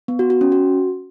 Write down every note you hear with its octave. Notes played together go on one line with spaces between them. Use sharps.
B3
F#4
F#4
C#4
F#4